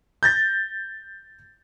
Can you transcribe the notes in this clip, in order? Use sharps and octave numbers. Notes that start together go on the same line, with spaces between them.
G6 A6 A#6